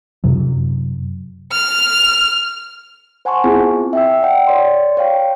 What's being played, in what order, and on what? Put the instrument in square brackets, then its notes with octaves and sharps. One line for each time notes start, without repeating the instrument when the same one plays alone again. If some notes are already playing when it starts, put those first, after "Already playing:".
[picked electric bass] F#2 C3 F#3
[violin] F6
[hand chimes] C5 F#5 G#5 A5 C6 C#6
B3 C4 E4 F4 G#4 C5
E5 G5 E6
D5 F#5 G5
C#5 D5 C6
C#5 F5 G5